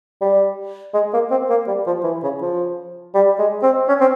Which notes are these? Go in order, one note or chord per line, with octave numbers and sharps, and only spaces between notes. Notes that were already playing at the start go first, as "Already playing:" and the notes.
G3
G#3
A#3
C4
A#3
G3
F3
E3
C#3
F3
G3
G#3
C4
C#4
C4